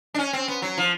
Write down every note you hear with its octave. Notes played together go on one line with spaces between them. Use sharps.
D4
C#4
C4
B3
F#3
F3